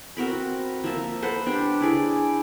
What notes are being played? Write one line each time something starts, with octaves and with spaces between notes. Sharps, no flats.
C4 F#4 A#4 B5
F3 A#3 E5 A5
B4 C5 F#5 A5
D4 G4
E4 G#4 D5